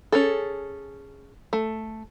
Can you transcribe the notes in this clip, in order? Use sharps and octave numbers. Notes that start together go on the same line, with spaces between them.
C#4 G#4 A4
A3